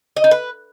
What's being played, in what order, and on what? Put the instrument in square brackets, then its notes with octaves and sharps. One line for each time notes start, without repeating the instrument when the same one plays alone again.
[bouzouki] D#5
D#4
B4